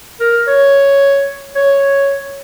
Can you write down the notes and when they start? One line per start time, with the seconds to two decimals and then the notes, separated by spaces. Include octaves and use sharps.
0.20 A#4
0.48 C#5
1.55 C#5